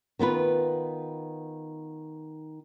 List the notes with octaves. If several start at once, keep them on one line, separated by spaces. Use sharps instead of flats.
D#3 B3 F4 B4